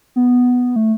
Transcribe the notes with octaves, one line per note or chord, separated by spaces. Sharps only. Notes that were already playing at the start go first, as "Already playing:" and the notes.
B3
A3